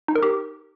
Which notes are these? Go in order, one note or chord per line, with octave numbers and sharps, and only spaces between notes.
D#4
A#4
G4